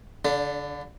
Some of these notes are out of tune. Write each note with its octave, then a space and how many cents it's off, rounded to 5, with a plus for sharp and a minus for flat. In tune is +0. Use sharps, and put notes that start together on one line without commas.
D3 -35 D4 +0